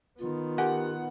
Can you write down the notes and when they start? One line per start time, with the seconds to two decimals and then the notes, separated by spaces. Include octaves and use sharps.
0.19 D#3 B3 F4
0.58 G4 A#4 F#5 G#5